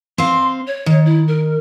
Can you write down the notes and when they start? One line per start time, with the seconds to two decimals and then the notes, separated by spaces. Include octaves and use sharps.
0.18 C4 F5 C6
0.67 C#5
0.86 D#3
1.06 E4
1.28 A#4